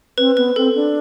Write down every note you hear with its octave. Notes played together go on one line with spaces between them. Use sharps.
C4 B4
B3 B4
C4 A4
D4